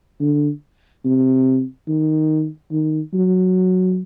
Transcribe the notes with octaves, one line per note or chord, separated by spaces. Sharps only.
D3
C3
D#3
D#3
F#3